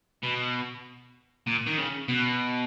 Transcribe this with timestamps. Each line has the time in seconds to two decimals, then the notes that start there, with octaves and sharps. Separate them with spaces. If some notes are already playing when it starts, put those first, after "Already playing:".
0.23 B2
1.47 A#2
1.66 D#3
1.78 C#3
2.08 B2